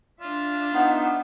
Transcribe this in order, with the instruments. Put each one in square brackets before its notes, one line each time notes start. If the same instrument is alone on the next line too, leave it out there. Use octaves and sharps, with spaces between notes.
[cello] D4 E5 [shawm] F4
[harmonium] B3 D#4 [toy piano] C#5 F#5 B5